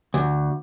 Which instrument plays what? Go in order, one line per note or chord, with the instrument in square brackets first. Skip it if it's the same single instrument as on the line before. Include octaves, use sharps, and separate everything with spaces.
[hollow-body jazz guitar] D2